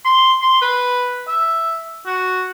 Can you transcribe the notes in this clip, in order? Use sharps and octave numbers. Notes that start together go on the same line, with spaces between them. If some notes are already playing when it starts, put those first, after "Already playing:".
C6
C6
B4
E5
F#4